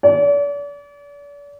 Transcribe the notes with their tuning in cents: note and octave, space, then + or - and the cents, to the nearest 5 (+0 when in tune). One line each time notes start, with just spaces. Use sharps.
D5 -40